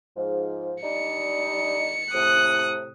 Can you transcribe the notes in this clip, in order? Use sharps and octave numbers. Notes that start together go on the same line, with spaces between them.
G#2 F3
G3 D4 D#4 C#7
A2 C3 D#6 F#6